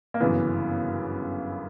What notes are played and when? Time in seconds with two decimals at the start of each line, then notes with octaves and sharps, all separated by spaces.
0.14 A#3
0.20 G1 F#2 C#3 E3 B3